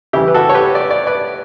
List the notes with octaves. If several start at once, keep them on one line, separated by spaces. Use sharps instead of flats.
C#3 E3 G3 E4 G4
B4
F#4 A4
C#5
G4 B4
D5
D5
B4 D5